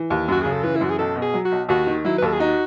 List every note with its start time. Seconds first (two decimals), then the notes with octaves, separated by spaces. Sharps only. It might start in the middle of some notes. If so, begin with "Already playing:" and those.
Already playing: E3
0.10 D#2
0.28 F#2 F#4
0.42 C#3 G#4
0.52 A4
0.63 E3 B4
0.76 E4
0.81 F#2 F#4
0.90 G#4
0.98 B1 A4
1.16 B2
1.22 G#4
1.34 F#3
1.45 F#4
1.52 B1
1.69 D#2 F#4
1.87 D#3
2.05 F#3 E4
2.18 B4
2.22 D#2 A4
2.32 G#4
2.40 D#4 F#4